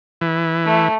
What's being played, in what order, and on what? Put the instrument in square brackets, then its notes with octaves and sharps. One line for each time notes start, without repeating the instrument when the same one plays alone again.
[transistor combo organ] E3
[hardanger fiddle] A3